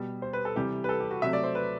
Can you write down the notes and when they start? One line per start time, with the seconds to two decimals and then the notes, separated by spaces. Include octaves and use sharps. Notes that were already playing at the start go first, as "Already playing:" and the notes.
Already playing: B2 G3
0.22 C5
0.33 B4
0.45 A4
0.56 C3 E3 G3 G4
0.84 B4
0.89 A4
1.00 G4
1.11 F#4
1.22 C3 F#3 A3 E5
1.33 D5
1.44 C5
1.55 B4